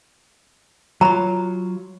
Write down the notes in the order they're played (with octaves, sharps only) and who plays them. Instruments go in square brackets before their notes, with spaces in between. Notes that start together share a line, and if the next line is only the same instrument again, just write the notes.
[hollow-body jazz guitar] F#3 F4 [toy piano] A#5 B5